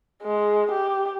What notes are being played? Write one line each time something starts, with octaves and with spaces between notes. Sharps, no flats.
G#3
G4